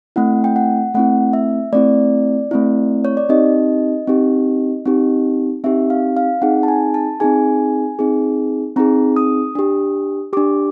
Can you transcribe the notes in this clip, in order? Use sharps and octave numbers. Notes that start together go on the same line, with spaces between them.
A3 C4 E4 F#5
G5
F#5
A3 C4 E4 F#5
E5
A3 C4 E4 D5
A3 C4 E4
C#5
D5
C4 D#4 G4 D#5
C4 D#4 G4
C4 D#4 G4
C4 D#4 G4 E5
F5
F5
C4 D#4 G#4 F#5
A5
G#5
A5
C4 D#4 G#4 G#5
C4 D#4 G#4
C4 D#4 G#4 A#5
D#6
D4 G4
D4 G4 D6